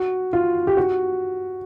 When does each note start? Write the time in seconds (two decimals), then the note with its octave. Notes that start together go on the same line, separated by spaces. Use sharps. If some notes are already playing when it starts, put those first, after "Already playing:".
Already playing: F#4
0.33 F4
0.67 G4
0.77 F#4